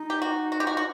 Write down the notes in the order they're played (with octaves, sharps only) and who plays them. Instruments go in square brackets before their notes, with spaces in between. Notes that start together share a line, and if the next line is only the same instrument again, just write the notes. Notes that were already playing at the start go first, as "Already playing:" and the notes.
Already playing: [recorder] D#4
[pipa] G4
F#4
F#4
G4
F#4
F#4